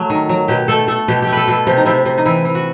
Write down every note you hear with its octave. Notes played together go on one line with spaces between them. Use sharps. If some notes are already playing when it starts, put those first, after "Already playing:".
Already playing: F#3 A3
D#3
F#3
B2 G4
A3 A4
A3 A4
B2 G4
A3 G4
A4 B4
B2 A4
C3 G4
D#4
C3 E4
C3
D#4
E3 E4
E3
F#4